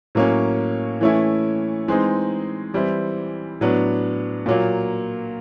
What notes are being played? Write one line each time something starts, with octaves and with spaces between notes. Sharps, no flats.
A2 F#3 A#3 C#4
E3 A3 C#4 E4
E3 G#3 C4 D#4
E3 G3 C4 E4
A2 F#3 B3 D4
A#2 F#3 A#3